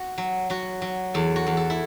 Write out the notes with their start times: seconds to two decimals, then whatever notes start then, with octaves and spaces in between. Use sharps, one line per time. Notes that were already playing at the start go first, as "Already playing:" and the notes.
Already playing: F#4
0.18 F#3
0.50 F#3 F#4
0.82 F#3
1.14 E2 A4
1.36 F#4
1.47 E2
1.57 A4
1.70 E4